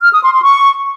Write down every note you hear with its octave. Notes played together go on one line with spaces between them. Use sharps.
F6
D#6
C6
C6
C#6